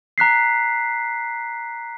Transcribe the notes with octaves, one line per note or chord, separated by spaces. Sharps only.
A#5 F#6 B6 C7